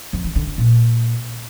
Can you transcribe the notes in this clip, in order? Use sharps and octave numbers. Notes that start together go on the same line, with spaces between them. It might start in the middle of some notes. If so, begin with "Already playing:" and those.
F2
E3
D3
D3
A#2